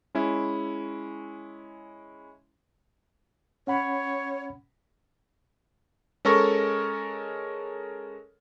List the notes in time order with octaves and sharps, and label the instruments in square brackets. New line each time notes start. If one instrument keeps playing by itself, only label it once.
[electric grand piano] G#3 C#4 E4
[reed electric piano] C#4 F#5 B5 [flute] C#5
[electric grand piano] G#3 C#4 A4 A#4 C#6 A#6